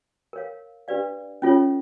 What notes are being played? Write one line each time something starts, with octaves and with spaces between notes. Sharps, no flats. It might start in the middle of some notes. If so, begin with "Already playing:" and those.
A#4 C#5 F5
D4 G4 B4 D5 F5
C#4 F4 A4 C#5